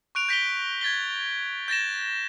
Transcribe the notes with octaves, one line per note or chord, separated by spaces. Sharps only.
C#6 F#6 D7 F7
G6 A#6 B6 D7 F7 G7
G#6 A6 B6 G7
G6 A6 A#6 E7